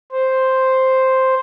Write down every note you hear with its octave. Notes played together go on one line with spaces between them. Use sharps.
C5